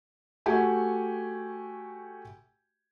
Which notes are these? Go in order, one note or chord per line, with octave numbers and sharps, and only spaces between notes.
A3 F#4 G4 G5 G#5